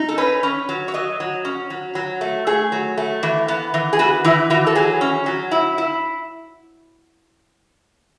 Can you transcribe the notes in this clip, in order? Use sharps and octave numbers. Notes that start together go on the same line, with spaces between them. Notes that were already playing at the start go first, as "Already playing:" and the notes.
Already playing: D#4
A4
C#4 B4
C#4
F#3
C#5
F#3 D#5
F#3
C#4
F#3
F#3
A3
A3 G#4
F#3
A3
E3
B3
E3
G#4
B3 F#4
E3 E4
E3 F#4
A4
F#3 G#4
C#4
F#3
E4
E4